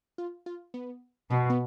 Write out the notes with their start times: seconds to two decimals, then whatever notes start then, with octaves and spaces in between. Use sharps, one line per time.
0.18 F4
0.46 F4
0.74 B3
1.30 B2 B3
1.50 B3